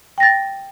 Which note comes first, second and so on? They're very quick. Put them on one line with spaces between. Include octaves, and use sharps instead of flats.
G5 A#6 A6